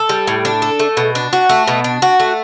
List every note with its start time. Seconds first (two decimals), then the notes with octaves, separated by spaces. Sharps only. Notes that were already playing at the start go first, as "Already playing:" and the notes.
Already playing: A4
0.09 G3
0.27 A2
0.45 D4
0.62 A4
0.80 A3
0.97 B2
1.15 D4
1.33 F#4
1.49 A3
1.67 B2
1.84 D4
2.02 F#4
2.20 A3